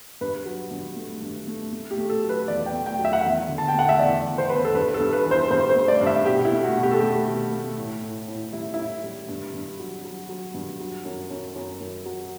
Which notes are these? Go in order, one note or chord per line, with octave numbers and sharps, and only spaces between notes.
G2 B4
F#3
G2
A3
G2
A3
A3
G4
A3
A4
F#3
B4
E2 D5
G5
A3
G5
F#3
E5
F#5
E2 E5
D3
A5
G5
A3 F#5
E5
E2 D5
E2
C5
E2 B4
A4
G2 B4
A4
G2
B4
E3
C5
G2 C5
C5
A3
D5
G2
E5
B2 G4
E4
A3
F#4
B2
G4
A4
A3 G4
B2
A3
A2
A2
A2
G3 E4
A2 E4
G3
G2
G2
F#3
F#3
F#3
G2
F#3
F#2
F#2
F#2
F#2
F#3